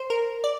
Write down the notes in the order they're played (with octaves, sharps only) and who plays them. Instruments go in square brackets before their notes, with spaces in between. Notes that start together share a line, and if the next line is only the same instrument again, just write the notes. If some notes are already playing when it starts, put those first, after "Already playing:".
Already playing: [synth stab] C5
A#4
D5